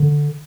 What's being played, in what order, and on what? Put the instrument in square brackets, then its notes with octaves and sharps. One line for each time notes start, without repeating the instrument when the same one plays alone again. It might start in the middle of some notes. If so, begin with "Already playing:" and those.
Already playing: [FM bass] D3